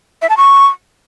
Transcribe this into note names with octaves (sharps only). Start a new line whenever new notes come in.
E5
A5
C#6